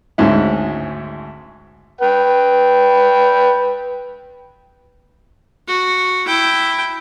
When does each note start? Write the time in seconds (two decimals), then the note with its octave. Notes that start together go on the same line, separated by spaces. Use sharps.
0.18 G#1 D2 G#2 C#4 E4
2.01 B4 G5
5.68 F#4
6.26 E4 G5